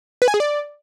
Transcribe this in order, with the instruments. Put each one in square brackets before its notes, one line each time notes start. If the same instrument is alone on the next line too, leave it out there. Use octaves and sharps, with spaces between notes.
[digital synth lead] B4
G#5
G#4
D5